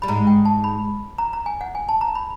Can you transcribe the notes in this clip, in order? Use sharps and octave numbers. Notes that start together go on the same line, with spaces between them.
G3 B5
G#2 G#3 A#5
G5
A5
B5
A#5
A#5
G#5
F#5
G#5
A5
A#5
B5